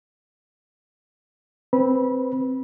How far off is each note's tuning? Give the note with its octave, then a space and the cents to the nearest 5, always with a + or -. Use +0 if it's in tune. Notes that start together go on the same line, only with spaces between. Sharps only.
C4 +0 B4 +0 B5 -25